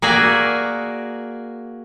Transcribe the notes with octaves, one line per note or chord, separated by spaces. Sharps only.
A#3 F#4 G#4 D5 E5